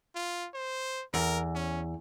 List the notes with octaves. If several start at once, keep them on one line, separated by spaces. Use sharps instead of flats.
F4
C5
E2 A#4
C#4